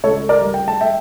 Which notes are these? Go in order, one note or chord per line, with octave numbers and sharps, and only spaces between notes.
C#2 A4 C#5
A#4 D5
G3
G5
A5
E5 G5